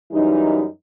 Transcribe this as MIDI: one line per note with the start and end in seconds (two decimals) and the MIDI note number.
0.12 0.65 42
0.12 0.65 52
0.12 0.65 55
0.12 0.65 63